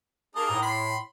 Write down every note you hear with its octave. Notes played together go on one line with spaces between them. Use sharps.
A#3 D#4 G#4 A#4 D#5 A5
A2
B5 C6